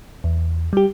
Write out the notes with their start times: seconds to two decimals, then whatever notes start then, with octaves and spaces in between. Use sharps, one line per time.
0.24 E2
0.73 G3 G4